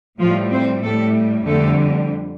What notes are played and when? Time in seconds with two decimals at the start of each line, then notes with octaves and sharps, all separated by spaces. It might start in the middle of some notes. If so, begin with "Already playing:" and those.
0.20 A2 F3 G3 F4
0.51 C4 C5
0.82 A2 G3 A3 A4
1.46 F2 D3 G3 A3 A4